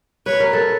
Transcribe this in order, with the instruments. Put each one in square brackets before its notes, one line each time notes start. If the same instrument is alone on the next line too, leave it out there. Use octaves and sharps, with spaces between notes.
[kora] B4 [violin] C#5
[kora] A#4
A4